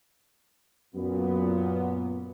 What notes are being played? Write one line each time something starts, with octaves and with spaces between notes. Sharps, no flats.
F#2 A#2 B3